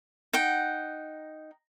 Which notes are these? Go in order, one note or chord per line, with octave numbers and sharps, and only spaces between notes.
D#4 F#5 G5